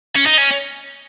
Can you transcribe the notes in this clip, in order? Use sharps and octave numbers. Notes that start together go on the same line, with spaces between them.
C#4
D#4
C#4